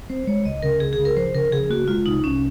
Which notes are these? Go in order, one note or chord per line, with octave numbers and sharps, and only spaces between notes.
C4 C5
G#3 C#5
C#2 D#5
C#3 A#4
C#2 G#4
G#4
C#3
A#4
F3 C5
C#3 A#4
C#3 G#4
A#3 F#4
G#3 F4
C2 D#4
C2 C#4